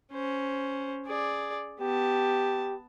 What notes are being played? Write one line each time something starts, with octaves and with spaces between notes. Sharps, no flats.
C#4 C5
G#4 D5
B3 G4 A5